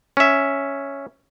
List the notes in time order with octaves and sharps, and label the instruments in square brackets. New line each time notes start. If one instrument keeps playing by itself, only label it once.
[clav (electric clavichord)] C#4 E5